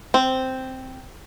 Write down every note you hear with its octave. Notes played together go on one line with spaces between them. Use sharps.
C4